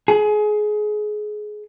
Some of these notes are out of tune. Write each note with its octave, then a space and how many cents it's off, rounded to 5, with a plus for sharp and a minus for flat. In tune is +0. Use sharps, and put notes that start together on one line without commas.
G#4 +25